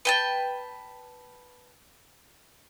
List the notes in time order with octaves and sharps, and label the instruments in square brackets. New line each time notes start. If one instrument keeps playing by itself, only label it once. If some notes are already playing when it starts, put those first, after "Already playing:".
[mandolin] B4 G5 A5